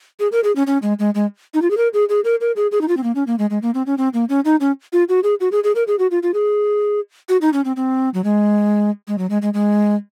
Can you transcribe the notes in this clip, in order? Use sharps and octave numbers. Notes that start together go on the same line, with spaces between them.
G#4
A#4
G#4
C#4
C#4
G#3
G#3
G#3
D#4
F4
G#4
A#4
G#4
G#4
A#4
A#4
G#4
G#4
D#4
F4
C4
A#3
C#4
A#3
G#3
G#3
A#3
C4
C#4
C4
A#3
C#4
D#4
C#4
F4
F#4
G#4
F#4
G#4
G#4
A#4
G#4
F#4
F4
F4
G#4
F#4
D#4
C#4
C4
C4
F#3
G#3
G#3
F#3
G#3
G#3
G#3